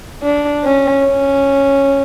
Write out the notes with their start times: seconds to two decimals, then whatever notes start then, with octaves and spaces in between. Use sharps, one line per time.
0.22 D4
0.64 C#4
1.05 C#4